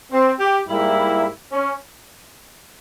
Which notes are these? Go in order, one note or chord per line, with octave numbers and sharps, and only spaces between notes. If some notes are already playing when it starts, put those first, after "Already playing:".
C4
G4
G#2 G3 A#3 E4
C#4